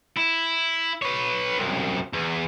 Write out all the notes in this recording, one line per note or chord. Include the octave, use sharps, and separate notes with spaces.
E4
B4 C#5
C2 F#2
E2